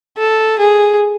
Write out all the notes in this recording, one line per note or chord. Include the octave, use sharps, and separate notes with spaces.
A4
G#4